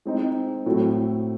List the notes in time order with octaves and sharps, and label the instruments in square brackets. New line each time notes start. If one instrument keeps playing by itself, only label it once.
[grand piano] G#3 C4 D#4
A2 F#3 A3 C4 E4